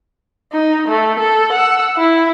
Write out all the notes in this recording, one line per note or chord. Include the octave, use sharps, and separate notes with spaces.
D#4
A3
A4
F#5 E6
E4